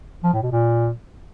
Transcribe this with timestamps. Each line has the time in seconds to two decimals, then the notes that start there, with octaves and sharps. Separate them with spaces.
0.24 F3
0.33 A2
0.43 B2
0.52 A#2